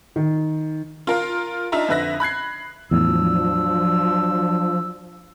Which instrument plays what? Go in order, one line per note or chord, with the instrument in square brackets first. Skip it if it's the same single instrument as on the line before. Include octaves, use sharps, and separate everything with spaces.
[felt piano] D#3
[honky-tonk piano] F4 A#4 F5
D4 D#4 F4 E5 A#5
F2 D3 B4 E5 F#6 A#6
B5 F#6 G#6 C7
[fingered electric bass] E2 A2 [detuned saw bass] F3 [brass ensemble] F#3 D4 [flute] E6